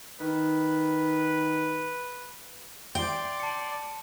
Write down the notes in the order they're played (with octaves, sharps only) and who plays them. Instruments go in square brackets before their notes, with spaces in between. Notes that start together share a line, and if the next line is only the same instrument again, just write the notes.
[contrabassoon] D#3 [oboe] B4
[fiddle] D5 C6 [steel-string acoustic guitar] G5
[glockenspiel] A5 C#7